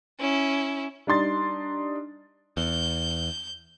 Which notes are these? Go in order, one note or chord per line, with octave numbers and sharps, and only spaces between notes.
C#4 E4
G3 D4 D#4 C6 A6
E2 G6